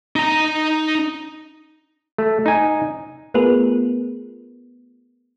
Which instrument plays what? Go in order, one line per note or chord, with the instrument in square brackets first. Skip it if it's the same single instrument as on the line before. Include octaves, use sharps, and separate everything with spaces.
[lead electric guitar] D#4 A#5
[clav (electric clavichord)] A3
D#4 G#5
[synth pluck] A3 B3 F4 G#4 A#4 B4